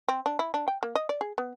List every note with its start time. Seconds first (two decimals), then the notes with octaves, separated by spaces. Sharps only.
0.08 C4
0.26 D4
0.39 E4
0.54 D4
0.68 G5
0.83 A#3
0.95 D#5
1.09 D5
1.21 G#4
1.38 B3